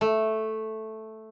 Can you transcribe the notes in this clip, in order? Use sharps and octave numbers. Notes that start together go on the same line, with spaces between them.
A3